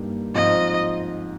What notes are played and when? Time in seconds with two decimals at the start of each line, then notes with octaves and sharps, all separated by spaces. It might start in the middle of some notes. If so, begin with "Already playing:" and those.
Already playing: G2 G3 A#3 D#4
0.35 G#2 F3 C4 F4 D#5